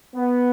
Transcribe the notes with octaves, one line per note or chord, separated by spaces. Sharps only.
B3